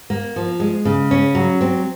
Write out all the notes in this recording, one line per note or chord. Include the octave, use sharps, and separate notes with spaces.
A#3
F3
G#3
C#3
C#4
F#3
C4